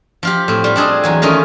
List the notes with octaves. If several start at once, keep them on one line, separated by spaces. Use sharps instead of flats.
F3 F4 G4
A2 C4
G3 F4
C4 D4 G#4 A4 D#5
E2 F#3 G#5
D#3 A3 C#4 F4 D#5